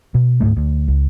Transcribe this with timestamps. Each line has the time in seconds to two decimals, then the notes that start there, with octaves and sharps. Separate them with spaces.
0.15 B2
0.40 D2 G#2 G#3 A3
0.57 D2
0.88 C#2